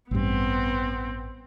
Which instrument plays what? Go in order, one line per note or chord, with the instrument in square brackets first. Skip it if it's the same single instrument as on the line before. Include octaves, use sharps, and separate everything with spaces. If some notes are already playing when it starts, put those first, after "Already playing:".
[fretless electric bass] A1 G2 [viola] B3 C4